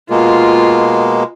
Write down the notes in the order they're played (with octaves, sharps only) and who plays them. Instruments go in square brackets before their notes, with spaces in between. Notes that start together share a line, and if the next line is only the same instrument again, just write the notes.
[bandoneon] B2 G#3 A#3 [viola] F4 C6